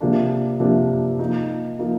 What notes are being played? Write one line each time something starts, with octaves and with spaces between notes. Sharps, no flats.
C3 F3 A#3 D4
C3 F3 A#3 D4
F3 A#3 D#4
F3 A#3 D#4